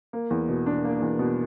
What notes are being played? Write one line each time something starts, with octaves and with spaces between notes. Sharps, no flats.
A#3
E2
B2
D4
A#3
E2
B2